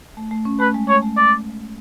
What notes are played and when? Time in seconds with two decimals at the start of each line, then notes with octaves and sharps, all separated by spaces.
0.17 A3
0.31 A3
0.45 C#4
0.60 A3 B4
0.74 G#3
0.89 A3 C#5
1.02 A3
1.17 D5